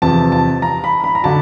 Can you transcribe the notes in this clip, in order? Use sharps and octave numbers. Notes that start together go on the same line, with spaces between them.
E2 C3 F3 A5
A5
A#5
B5
B5
A#5
D3 F#3 A5